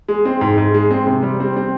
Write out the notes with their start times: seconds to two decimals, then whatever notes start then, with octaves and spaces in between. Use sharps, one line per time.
0.09 G#3
0.25 C4
0.41 G#2
0.58 G#2
0.74 G#3
0.91 C4
1.07 C3
1.23 G3
1.40 C4
1.56 C4